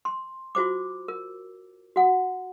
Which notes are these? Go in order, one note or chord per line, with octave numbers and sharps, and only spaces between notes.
C6
F4 F#4 C5 D6
A#4
F#4 F#5